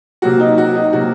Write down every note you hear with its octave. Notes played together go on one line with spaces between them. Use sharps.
C3 F#3 A#3 F#4
D#4
F#4
D#4
C3 F#3 A#3 F#4